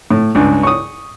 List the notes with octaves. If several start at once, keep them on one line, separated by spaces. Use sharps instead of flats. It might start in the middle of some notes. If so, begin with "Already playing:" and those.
A2
C#2 G2
C#6 D#6